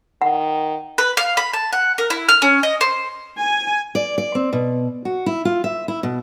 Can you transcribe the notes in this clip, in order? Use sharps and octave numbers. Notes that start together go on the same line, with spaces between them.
D#3 F#5
B4
F5
B5
A5
F#5
A#4
E4
F6
C#4
D#5
C5
G#5
D5
D5
C4
B2
F#4
E4
F4
E5
E4
B2